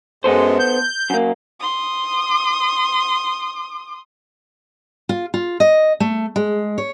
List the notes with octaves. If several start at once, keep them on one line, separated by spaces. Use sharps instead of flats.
F#2 G#3 B3 A4 C5
G6
F#2 A#3
C6 D#6
F4
F4
D#5
A3
G#3
C#5